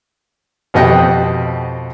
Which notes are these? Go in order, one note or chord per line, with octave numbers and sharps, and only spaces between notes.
F2 B2 G4 D#5 F#5 G5